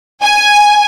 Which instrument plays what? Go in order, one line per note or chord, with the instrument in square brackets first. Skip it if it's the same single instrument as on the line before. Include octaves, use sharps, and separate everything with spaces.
[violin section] G#5